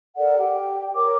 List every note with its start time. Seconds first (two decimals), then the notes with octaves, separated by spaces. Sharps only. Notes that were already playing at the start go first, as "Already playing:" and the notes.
0.17 A4 A#4 D5 F#5
0.38 G4 G5
0.95 A#4 C#5 D6